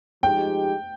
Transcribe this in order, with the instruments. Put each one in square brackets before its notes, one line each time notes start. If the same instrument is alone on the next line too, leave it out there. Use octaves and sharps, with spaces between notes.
[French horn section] F3 G#3 D#4 G4 [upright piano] G5